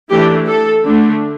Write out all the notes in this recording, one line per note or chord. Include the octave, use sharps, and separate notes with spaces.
E3 A3 D4 G4
A4
D3 A3 D4